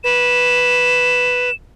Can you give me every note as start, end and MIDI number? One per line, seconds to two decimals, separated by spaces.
0.04 1.50 71
0.04 1.54 100